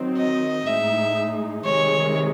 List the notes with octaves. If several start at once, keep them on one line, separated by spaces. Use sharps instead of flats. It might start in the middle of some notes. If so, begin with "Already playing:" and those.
Already playing: D#3 F#3 C4 D#4
D#5
A2 G#3 D#4 E5
C3 D#3 G#3 C#5